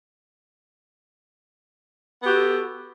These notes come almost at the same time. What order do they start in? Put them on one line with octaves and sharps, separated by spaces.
B3 G4 F#4 A4